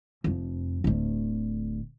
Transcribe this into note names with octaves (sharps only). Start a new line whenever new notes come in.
F1 F2
D1 D2